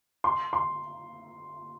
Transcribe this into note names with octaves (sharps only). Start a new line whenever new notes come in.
C6
C6